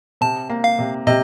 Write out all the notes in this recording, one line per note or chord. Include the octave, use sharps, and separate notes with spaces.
C3 A5
A#3
F5
C3
C3 D#5